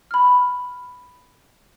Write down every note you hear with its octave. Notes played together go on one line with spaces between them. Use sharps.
B5 F6